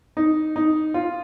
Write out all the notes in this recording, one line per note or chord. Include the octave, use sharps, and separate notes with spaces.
D#4
D#4
F4